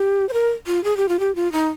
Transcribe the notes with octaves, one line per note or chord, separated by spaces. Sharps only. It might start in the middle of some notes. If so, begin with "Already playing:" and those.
Already playing: G4
C5
A#4
F4
G#4
G4
F4
G4
F4
D#4